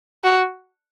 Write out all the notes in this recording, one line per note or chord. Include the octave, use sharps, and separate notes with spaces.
F#4